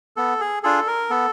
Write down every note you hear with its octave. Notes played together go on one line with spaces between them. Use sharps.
B3 A4
G#4
D4 F4 G#4 A4
A#4
B3 A4